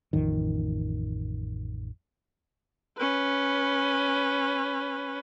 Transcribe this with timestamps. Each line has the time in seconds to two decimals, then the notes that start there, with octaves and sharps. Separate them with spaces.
0.13 A1 F2 D#3
2.98 C#4 B4